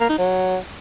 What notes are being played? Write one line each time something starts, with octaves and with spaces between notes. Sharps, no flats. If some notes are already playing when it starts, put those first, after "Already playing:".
A#3
D#4
F#3